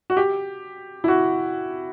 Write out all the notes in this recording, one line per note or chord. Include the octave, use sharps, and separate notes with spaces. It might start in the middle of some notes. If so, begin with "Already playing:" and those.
F#4
G4
E4
F#4